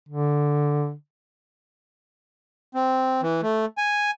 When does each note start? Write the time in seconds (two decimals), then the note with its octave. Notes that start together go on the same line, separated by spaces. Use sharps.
0.09 D3
2.75 C4
3.22 E3
3.43 A3
3.78 G#5